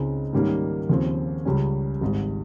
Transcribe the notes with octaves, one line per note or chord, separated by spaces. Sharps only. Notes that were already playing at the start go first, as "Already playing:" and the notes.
Already playing: C#2 C#3 G#3 C4 D#4
G#2 D#3 G3 A#3 C#4
D#2 C#3 F3 C4
C#2 C#3 G3 C#4
G#1 G#2 G3